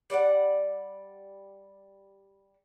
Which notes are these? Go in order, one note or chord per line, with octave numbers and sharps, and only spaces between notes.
G3 D5 F5 F#5